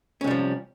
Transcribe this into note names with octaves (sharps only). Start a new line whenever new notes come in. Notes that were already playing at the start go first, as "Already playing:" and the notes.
C3 F3 G3 C#4